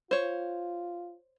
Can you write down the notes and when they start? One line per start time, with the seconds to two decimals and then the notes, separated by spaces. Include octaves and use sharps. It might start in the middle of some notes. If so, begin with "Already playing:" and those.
0.11 F4 C5 C#5